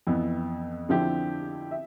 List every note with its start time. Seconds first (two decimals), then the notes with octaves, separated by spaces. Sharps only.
0.07 F2 E3 B3
0.89 D3 F3 C4 E4 G4
1.71 E5